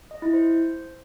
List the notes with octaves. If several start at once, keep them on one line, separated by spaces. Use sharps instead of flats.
D#5
E4
C5